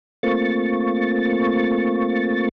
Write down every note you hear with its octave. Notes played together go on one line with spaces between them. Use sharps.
A3 A#3 C4 F4 C#6 A6